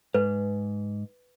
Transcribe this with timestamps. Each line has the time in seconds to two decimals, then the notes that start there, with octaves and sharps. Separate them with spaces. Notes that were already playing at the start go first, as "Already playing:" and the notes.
0.14 G#2 B4